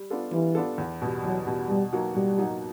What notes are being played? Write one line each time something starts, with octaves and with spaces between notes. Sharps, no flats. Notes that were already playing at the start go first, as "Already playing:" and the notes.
Already playing: G3
B3 D4 F4 A4
E3 G3
B3 D4 F4 A4
E2
B2 G3
E2 F#3
B2 G3
B2 G3
F#3 A#3 D#4 F#4
B2 G3
F#3 A#3 D#4 F#4